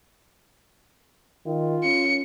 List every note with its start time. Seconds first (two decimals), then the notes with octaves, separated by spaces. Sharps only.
1.46 D#3 F4
1.84 C#4 C#7